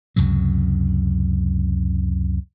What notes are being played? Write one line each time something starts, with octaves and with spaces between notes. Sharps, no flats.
C#2 F#2 C3 F#3